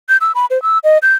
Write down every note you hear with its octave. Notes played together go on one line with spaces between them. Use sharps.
G6
E6
B5
C5
E6
D#5
G6